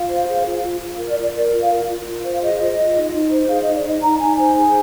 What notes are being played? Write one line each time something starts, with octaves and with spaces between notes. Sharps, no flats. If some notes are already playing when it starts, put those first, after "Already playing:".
Already playing: F4 F5
C5
G#4
F4
F4
F4
A#4
D5
F4
D5
A#4 D5
F4
F5
A#4
F4
F4
C5
F5
G#4 D#5
F4
F4
D#4
D#4
C5
G#4 F5
D#4 D#5
D5
D#4 D#5
D#4 A#5
D#4 G#5
C5 G#5
G#4